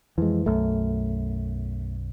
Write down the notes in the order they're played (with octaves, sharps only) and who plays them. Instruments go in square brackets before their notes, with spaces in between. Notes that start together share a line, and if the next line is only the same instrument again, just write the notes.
[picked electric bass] F2 [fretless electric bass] E3 G#3
[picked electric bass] B1 F#2 [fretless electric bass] A3